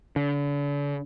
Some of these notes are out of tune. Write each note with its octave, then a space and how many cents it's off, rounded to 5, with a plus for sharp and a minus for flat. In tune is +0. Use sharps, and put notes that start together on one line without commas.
D3 -40